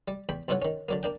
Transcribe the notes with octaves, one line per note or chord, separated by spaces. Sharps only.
G3
E2 G5 B5
B1 G2 E4 F4 C#5 F#5
D#3 C#4
D3 F#3 A#3
A#3 D4 G5